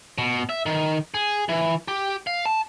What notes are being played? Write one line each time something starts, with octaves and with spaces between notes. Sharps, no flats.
B2
E5
D#3
G#4
E3
G4
F5
A5